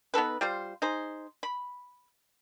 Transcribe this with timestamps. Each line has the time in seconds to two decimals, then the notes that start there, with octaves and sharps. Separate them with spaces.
0.14 B3 D#4 A4 B4
0.41 G3 F4 C5
0.82 D#4 G#4 C5
1.43 B5